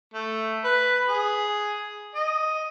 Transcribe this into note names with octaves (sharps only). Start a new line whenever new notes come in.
A3
B4
G#4
D#5